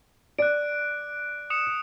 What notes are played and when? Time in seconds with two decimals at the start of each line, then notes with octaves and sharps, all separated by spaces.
0.39 D5 F#6 D7
1.50 D#6 C#7 E7